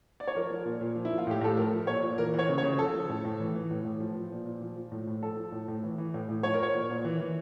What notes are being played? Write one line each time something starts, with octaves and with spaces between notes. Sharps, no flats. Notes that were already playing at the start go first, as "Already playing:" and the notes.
D5
C#5
F3 A#4
F3
A#2
A#2
F3
E4
F3
F4
A2 G4
A2 A4
F3 A#4
F3
A#2 C#5
A#2
E3 A#4
E3 C#5
C#3
C#5
C#3
F3 A4
F3
A2
A2
E3
E3
A2
A2
F3
F3
A#2
A#2
F3
F3
A2
A2
F3 A4
F3
A2
A2
E3
E3
A2
A2
F3 C#5
A#4
F3 C#5
A#2
A#2
E3
E3